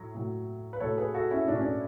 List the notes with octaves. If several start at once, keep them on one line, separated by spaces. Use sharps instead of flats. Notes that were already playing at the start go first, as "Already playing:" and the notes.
Already playing: A2 F#3
A2 F#3
B4
A2 F#3 A4 C#5
G#4 B4
F#4 A4
C#4 E4
A2 F#3 D4
C#4
D4